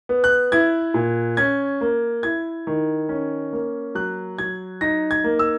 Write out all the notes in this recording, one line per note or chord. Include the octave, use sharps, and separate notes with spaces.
B3
F#6
E4 G#6
A#2
C#4 G#6
A#3
E4 G#6
D#3
C#4
A#3
F#3 F#6
F#3 G#6
D#4 A#6
G#6
A#3
E6